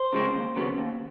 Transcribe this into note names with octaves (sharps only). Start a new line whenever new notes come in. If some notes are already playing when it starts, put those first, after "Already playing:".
Already playing: C5
C#3 F3 G#3 C4
D#2
C#3 F#3 B3
D#2